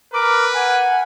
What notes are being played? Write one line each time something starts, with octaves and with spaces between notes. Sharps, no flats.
A#4 B4 D6
F#5 G#5